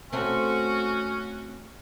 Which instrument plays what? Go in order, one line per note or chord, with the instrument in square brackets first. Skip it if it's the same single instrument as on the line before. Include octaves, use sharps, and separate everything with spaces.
[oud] A3 C4 [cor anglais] C#4 [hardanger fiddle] F#4